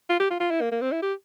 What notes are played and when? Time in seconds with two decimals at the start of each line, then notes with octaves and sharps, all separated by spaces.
0.10 F4
0.20 G4
0.30 F4
0.40 F4
0.51 E4
0.61 A#3
0.72 A#3
0.81 C4
0.92 E4
1.02 G4